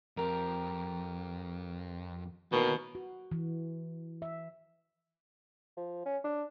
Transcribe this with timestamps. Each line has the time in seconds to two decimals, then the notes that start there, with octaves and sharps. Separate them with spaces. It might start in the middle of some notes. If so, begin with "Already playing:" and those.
0.17 F2 G4 A#4
2.52 B2 D#3 E3 A#3 C#4
2.95 F#4
3.32 E3
4.22 E5
5.77 F3
6.05 C#4
6.24 D4